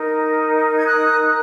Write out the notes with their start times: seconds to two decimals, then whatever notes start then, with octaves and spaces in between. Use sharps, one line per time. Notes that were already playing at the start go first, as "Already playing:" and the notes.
Already playing: D#4 A#4
0.79 G#6
0.86 D#6 F#6